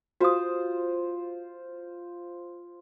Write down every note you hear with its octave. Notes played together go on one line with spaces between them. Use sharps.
F4 F#4 C5 D#6